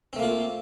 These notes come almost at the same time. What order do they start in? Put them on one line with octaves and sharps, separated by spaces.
C4 A3 A#3 F4